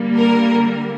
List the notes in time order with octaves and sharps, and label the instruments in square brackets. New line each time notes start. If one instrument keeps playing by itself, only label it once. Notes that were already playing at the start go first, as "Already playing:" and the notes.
Already playing: [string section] D3 G3 A#3
A#4